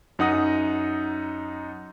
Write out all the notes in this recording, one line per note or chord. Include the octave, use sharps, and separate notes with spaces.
F#2 D#4 F#5 D#6 A#6